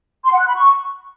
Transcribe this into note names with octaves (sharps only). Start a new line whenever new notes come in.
C6
F#5
F#6
B5
C#6